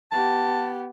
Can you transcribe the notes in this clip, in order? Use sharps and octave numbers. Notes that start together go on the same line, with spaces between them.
B3 G4 A5